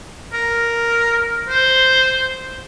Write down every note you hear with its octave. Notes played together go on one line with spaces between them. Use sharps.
A#4
C5